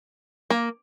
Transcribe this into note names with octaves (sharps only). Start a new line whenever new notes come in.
A#3